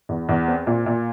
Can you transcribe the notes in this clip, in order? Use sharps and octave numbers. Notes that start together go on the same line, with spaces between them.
E2
E2
C4
A#2
A#2